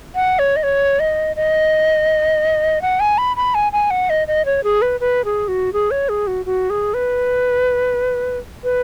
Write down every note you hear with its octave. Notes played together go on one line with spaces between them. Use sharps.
F#5
C#5
D#5
C#5
D#5
D#5
F#5
G#5
B5
B5
G#5
G#5
F#5
D#5
D#5
C#5
G#4
B4
B4
G#4
F#4
G#4
C#5
G#4
F#4
F#4
G#4
B4
B4